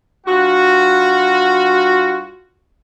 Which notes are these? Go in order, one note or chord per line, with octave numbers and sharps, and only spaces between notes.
G2 F4 F#4